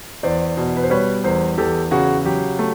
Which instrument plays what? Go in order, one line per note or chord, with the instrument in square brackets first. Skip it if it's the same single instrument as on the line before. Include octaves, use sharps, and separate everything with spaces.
[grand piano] E2 C5 D5
B2
B4
C5
G3 B4 C#5
E2 A#4 C5
E2 G4 A4
C#3 F#4 G#4
F#3 G4
A3